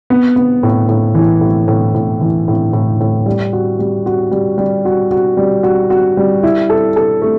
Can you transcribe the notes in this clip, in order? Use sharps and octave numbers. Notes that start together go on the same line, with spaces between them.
B3
B3
A2
A2
E3
A2
A2
A2
E3
A2
A2
A2
G3
F#4
G3
F#4
G3
G3
F#4
F#4
G3
F#4
F#4
G3
E4
A4
A4
A3